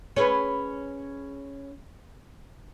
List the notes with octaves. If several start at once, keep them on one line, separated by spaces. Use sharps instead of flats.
C#4 G#4 B4